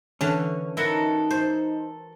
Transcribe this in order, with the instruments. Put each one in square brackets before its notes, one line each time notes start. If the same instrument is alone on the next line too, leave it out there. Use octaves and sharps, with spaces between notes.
[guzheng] D3 E3 [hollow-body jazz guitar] C#4
[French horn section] D#4 [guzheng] E4 [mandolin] F#4 A4 A#4
[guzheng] C5